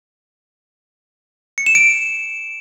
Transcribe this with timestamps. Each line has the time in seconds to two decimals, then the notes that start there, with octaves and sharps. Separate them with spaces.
1.58 C#7
1.66 E7
1.75 D7